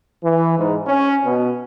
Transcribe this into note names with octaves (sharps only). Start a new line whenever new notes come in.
E3
G#2
C#4
B2